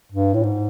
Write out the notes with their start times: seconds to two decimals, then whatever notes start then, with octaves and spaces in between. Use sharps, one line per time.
0.12 G2
0.34 A2
0.43 G#2